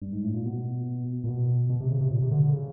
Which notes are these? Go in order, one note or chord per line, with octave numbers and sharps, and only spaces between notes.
G2
G#2
A2
A#2
B2
A#2
B2
B2
C3
C#3
C3
A#2
C3
D3
D3
C#3